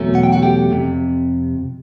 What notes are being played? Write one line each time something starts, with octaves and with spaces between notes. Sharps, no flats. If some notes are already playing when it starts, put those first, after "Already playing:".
Already playing: E2 B2 F#3 A3 C#4
F#5
G5
F#4 F#5
G4 G5
F2 C3